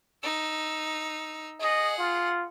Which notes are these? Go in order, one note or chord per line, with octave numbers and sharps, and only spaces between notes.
D#4 E6
G#4 D#5 F#5
F4